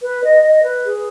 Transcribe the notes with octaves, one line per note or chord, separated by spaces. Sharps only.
B4
D#5
D#5
B4
G#4